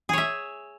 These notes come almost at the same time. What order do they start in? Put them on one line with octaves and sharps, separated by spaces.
G#4 C#5 E5